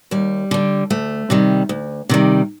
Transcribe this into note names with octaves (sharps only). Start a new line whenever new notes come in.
D#2 G3
D3 G3
D2 A3
C3 D#3 G3
D2
C3 D#3 G3